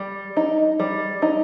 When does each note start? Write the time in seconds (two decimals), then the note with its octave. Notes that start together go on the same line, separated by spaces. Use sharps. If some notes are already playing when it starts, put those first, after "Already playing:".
Already playing: G3
0.37 D#4
0.80 G3
1.22 D#4